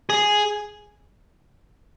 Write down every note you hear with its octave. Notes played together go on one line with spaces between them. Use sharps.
G#4